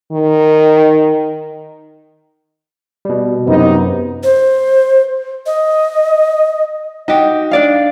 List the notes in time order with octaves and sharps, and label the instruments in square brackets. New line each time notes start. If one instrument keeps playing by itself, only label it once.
[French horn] D#3
[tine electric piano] B2 G3
[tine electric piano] F#2 [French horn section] C3 B3 D#4
[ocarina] C5
D#5
[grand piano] D#4 [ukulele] F#4 G4
[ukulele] D4 D5 F5